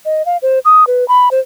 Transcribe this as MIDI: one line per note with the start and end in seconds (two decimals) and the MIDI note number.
0.05 0.25 75
0.26 0.37 77
0.42 0.59 72
0.65 0.87 87
0.87 1.07 71
1.08 1.29 83
1.31 1.40 72